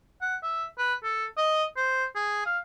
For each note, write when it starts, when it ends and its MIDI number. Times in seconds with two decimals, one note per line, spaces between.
0.22 0.36 78
0.43 0.66 76
0.78 0.94 71
1.04 1.25 69
1.38 1.64 75
1.76 2.05 72
2.15 2.42 68
2.46 2.58 77